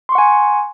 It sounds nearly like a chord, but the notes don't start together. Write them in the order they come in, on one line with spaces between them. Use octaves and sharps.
C6 C#6 F#5 G#5